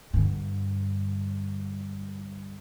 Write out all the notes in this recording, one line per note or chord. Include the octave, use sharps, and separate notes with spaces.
G2 D3